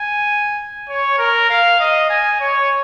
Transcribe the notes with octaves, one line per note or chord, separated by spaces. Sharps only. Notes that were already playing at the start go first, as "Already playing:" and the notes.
Already playing: G#5
C#5
A#4
F5
D#5
G#5
C#5